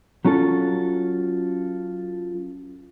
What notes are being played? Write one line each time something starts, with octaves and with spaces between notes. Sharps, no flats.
F#3 C#4 F4 A4